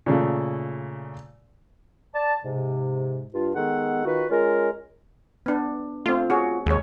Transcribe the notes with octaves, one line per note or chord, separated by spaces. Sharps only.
A#2 C#3 A3
D5 A5
G#2 C3
G2 F4
D#3 G#3 B3 A4 F#5
D#3 F4 F#4 B4
G#3 C#4 F4 A#4
B3 D4
A3 C4 F4
F#4 G#4 C#5
D#2 G#3 C#5